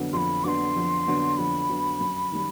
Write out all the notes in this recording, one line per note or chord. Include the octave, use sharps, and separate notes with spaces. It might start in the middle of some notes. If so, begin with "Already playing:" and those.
Already playing: F2 D3 F#3 B3 D4
F2 B5 C6
D3 F#3 B3 D4 C6 D6
F2
D3 F#3 B3 D4
F2 B5
D3 F#3 B3 D4
F#2
D#3 G3